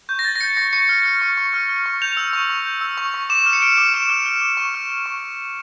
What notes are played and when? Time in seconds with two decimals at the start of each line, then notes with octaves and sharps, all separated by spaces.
0.09 C#6 G6
0.19 A#6
0.25 G6 A6
0.36 A#6
0.41 G6 C#7
0.57 C#6 A#6
0.73 C#6 C#7
0.89 F6
1.05 F6
1.22 C#6
1.37 C#6
1.54 F6
1.69 F6
1.86 C#6
2.02 G6 F7
2.17 E6
2.33 C#6
2.50 C#6
2.66 G6
2.81 E6
2.98 C#6
3.14 C#6
3.29 D6 E7
3.46 F6
3.53 C#7
3.62 F6 D7
3.78 D6
3.94 D6 E7
4.10 F6
4.26 F6
4.42 D6
4.57 C#6
4.74 F6
4.89 F6
5.06 C#6